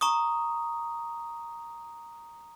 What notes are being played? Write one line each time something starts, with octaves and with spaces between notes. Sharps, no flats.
A#5 C#6 D#6